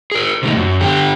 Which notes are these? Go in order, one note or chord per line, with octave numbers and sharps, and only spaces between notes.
G#4 A#4
C3 D#3 A3 D#4
F#2
D3 G4